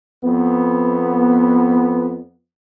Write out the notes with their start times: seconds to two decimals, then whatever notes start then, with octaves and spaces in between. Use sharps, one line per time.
0.24 F2 B3